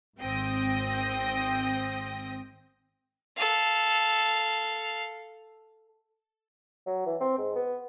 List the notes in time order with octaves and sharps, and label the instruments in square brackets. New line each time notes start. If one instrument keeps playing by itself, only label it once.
[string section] G#1 C4 G5 D#6 A#6
[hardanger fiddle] A4 F5
[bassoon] F#3
E3
C4
G#2
B3